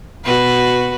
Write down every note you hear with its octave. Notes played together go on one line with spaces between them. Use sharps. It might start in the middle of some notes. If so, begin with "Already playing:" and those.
B2 F#4 B4